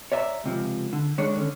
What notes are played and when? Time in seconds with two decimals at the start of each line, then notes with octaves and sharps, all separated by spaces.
0.12 C#5 D5 E5 G#5 A#5
0.44 C#2 C3 F3
0.93 D3
1.18 D#3 G#3 D4 C#5
1.36 D3 C#4